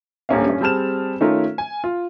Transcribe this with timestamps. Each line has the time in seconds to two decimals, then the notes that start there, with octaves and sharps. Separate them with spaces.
0.29 D#1 A1 A#3 C#4 D4 F5
0.46 G2 C#4
0.61 G3 C4 G#4 A5 F6 E7
1.20 D#3 A3 C#4 D#4 F4 A#4
1.58 G#5
1.84 F4